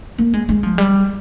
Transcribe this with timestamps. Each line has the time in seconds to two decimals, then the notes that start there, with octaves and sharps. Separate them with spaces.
0.18 A#3
0.34 G#3
0.49 G#3
0.63 F3
0.78 G3